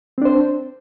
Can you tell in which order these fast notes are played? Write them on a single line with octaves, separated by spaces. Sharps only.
C4 D4 C5